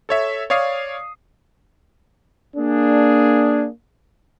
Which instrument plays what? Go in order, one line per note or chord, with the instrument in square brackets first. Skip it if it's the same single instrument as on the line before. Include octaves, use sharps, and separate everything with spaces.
[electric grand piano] A4 C#5 E5
C#5 D5 F5 D#6 C7
[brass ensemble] A#3 D4 G#4